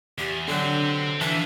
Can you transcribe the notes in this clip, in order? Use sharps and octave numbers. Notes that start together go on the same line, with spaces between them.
E2 G4
D3 F#3 C4 D4 G4
E3 F3 D4 A5